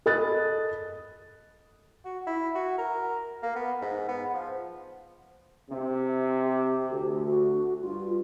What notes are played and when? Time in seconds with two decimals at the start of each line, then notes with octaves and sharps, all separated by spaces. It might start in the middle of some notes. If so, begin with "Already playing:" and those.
0.06 A4 D#5 B5 D#6 F#6 A6
2.05 F#4
2.27 E4
2.55 F#4
2.78 A#4
3.42 A#3
3.55 B3
3.82 G#2
4.08 B3
4.34 F3
5.69 C3 C4
6.43 G4
6.89 D2
7.25 F#4
7.81 G2 F4